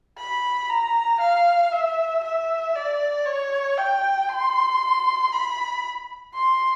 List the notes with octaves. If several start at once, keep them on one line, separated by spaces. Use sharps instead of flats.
B5
A#5
F5
E5
E5
D5
C#5
G5
C6
B5
C6